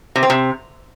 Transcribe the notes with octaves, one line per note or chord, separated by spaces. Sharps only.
C3
C4
C3